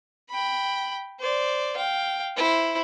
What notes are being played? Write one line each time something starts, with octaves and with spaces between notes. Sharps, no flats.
G5 B5
C5 D5
F5 G5
E4 C5